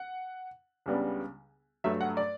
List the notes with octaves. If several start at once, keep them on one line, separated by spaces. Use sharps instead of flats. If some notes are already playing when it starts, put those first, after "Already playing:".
Already playing: F#5
C#2 C#3 G3 B3 D4
G2 F#3 A3 E5
F#5
D5